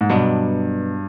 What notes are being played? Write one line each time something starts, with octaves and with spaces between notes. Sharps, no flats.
G#2
G2 B2 F#3 B3 D4